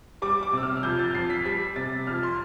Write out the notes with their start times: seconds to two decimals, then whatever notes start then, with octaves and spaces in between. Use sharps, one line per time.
0.22 G3 D6
0.43 D6
0.53 C3 E6
0.63 F6
0.77 F6
0.83 F2 G6
0.99 A6
1.14 F2 C7
1.30 B6
1.45 G3 B6
1.76 C3 A6
2.07 F2 F6
2.23 C6